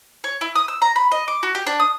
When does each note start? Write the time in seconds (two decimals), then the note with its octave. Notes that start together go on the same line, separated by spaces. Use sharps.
0.24 C#5
0.41 E4
0.56 D#6
0.68 E6
0.82 A#5
0.96 B5
1.12 D#5
1.28 D6
1.43 F#4
1.55 G4
1.67 D4
1.80 D#6